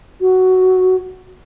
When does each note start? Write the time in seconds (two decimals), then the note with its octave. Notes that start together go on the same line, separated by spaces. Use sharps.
0.21 F#4